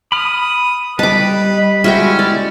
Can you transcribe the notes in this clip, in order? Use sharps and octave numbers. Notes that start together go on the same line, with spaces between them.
B5 D#6 F6
G3 B4 D#5 A5 D6
G#3 C#4 E4 F#4 G5
D5